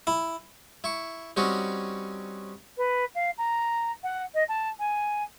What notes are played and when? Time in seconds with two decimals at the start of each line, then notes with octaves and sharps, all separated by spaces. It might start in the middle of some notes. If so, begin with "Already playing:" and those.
0.07 E4
0.84 E4 C#6
1.37 G3 C4 C#4 D#4 F#4
2.77 B4
3.14 F5
3.37 A#5
4.03 F#5
4.34 D#5
4.48 A5
4.79 G#5